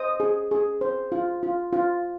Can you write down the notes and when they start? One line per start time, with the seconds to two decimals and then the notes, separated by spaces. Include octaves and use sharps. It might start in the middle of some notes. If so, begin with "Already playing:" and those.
Already playing: C5 D#5 D#6
0.20 G#4
0.51 G#4
0.81 C5
1.12 F4
1.43 F4
1.73 F4